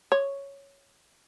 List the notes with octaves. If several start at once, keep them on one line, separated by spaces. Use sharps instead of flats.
C#5